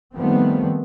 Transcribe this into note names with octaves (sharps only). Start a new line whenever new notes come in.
D#3 F3 G3 A3 B3 C4